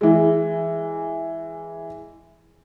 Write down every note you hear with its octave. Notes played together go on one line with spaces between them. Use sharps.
E3 G#3